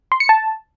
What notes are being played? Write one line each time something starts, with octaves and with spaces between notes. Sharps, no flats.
C6
C#7
A5